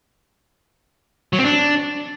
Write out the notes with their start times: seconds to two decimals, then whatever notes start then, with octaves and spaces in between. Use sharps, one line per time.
1.33 F#3
1.39 C4
1.44 D4